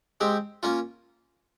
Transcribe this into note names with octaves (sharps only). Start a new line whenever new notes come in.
G#3 C4 G4
A#3 C#4 F4